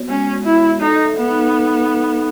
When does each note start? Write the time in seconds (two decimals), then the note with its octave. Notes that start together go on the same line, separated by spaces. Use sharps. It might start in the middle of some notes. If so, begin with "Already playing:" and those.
Already playing: B3 F#4 C#5
0.08 G#3 C#4
0.33 F#4
0.45 E4
0.57 C#5
0.80 D#4 A4
1.06 E5
1.17 B3
1.29 D#4